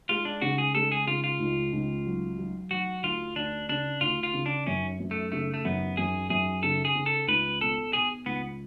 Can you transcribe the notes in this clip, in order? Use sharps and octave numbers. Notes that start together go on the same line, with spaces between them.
G#3 F4
D4
C#3 F#4
G#4
G#3 A4
G#4
C#3 F4
F4
C#2
C#2
F#3
F#3
F#3 F#4
D2 F4
D2 D4
C#3 D4
D2 F4
F4
C#3
D4
F#2 C#4
F#2
A3
C#3 A3
A3
F#2 B3
F#2 G#4
F#2 G#4
C#3 A4
G#4
C#3
A4
C#2 B4
B2 A4
B2 G#4
C#2 B3